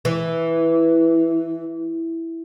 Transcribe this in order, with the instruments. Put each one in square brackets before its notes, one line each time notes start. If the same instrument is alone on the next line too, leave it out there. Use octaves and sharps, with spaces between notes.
[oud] E3